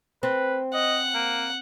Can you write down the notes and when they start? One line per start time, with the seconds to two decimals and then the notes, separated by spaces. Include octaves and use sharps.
0.23 C4 B4
0.74 D#5 F#5
1.14 A#3